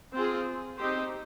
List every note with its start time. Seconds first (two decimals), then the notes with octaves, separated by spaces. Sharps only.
0.13 C4 F4 G#4
0.77 C4 D#4 G4 C5